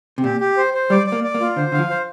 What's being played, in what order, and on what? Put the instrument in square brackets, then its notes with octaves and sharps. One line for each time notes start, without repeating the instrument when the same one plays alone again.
[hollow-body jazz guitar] C3
[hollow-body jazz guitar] A#2 [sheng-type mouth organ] G4
[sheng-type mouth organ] G4
C5
C5
[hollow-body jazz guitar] G3 [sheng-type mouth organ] D5
[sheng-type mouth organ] D5
[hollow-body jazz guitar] A#3
[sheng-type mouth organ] D5
[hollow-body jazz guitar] A#3
[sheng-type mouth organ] F4
[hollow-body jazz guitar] D3 [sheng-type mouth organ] C5
[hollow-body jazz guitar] D3 [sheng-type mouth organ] F5
[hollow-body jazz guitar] F3
[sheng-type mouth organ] C5